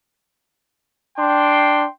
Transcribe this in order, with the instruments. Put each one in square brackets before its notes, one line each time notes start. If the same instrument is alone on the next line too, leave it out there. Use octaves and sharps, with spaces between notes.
[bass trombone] D4 [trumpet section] G5 C6